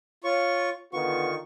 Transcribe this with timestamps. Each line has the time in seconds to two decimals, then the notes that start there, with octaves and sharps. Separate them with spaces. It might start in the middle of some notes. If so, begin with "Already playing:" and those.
0.24 F4 C#5 C#6
0.93 D3 D#3 B3 F4 C#6